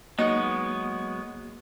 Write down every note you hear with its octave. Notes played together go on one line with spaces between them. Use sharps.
F#3 G#3 A#3 B3 D#4 C#6 F#6